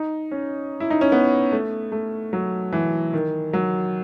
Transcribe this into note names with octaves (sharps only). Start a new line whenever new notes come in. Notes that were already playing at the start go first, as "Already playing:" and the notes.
Already playing: D#4
C#4
E4
D#4
C#4
B3
A3
A3
F#3
E3
D#3
F#3